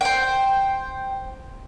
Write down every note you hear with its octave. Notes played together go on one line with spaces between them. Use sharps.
C5 G5